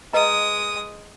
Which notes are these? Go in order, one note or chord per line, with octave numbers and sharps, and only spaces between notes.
G#3 B4 D#5 A#5 D#6